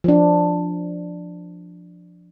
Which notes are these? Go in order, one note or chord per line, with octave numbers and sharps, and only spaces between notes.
F3 D4